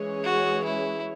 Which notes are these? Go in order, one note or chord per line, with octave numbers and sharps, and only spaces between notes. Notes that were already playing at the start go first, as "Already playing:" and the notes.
Already playing: E3 G#3 C#4 G#4 C#5
F#4
E4